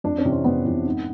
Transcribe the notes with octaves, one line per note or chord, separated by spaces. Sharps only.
F2 D4
C#4
C3 E3
C4
F2 B3
C3 E3
G#2